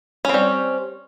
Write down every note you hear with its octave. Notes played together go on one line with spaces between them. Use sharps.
G3 C4 C#4